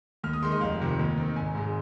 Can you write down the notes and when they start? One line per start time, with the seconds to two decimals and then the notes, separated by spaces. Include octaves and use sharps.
0.24 D#2 F6
0.33 D#6
0.42 D#3 G#3 C6
0.52 D#5
0.61 F1 F5
0.80 F2 C3 D#3
0.99 D#2
1.18 D#3 C4
1.36 G#1 G#5
1.55 G#2 G#3